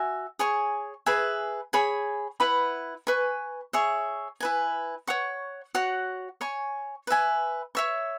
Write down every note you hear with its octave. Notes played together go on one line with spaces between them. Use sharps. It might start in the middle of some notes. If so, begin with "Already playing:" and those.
Already playing: F#4 E5 G#5
G#4 C#5 G#5 C#6
G#4 B4 E5 G#5
G#4 C#5 G#5 B5
E4 B4 F#5 B5
B4 G#5 C#6
G#4 C#5 E5 C#6
E4 B4 G#5
C#5 F#5 C#6
F#4 C#5 F#5
C#5 G#5 C#6
B4 E5 G#5
C#5 E5 C#6